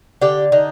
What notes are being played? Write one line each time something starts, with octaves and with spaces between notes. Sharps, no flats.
D3 G4
D3 D#4